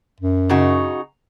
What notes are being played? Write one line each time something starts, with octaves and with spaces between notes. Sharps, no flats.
F#2
C#3 D#4 F#4